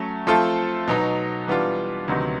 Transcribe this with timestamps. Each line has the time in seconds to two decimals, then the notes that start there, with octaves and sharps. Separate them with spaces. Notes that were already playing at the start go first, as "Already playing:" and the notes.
Already playing: F#3 A3 C#4
0.27 F3 A3 C4 F4 A4
0.88 B2 F#3 B3 D#4
1.48 E3 G3 B3 D4 F4
2.08 D2 C3 D#3 F#3 B3